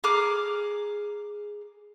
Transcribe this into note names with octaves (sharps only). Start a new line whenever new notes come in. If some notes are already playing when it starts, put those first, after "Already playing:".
G#4 A#5 D6 F6